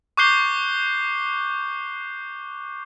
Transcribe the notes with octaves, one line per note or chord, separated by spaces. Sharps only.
C#6 D6 F#6 G6 C7 G7